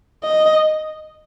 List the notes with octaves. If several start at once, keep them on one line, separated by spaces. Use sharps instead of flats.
D#5